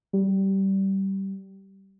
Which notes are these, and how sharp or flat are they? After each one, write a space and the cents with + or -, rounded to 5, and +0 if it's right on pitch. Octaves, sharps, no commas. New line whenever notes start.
G3 -20